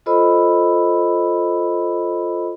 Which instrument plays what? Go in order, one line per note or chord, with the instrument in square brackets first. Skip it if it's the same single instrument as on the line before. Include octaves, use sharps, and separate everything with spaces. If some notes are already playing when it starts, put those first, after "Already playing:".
[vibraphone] F4 A4 C5 D#5 B5 E6